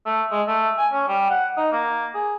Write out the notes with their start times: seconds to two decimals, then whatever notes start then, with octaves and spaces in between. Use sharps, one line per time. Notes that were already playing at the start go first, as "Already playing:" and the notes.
0.06 A3
0.31 G#3
0.47 A3
0.78 G#5
0.93 C#4
1.08 G3
1.30 F#5
1.57 D#4
1.72 A#3
2.14 G#4